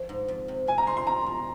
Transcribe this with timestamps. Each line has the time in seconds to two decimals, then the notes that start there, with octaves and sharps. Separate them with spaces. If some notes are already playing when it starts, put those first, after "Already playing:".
Already playing: F3
0.09 G#2
0.28 F2
0.48 C3
0.67 C3 G#5
0.78 A#5
0.87 D#4 C6
0.97 C6
1.07 D#3 A#5
1.26 F2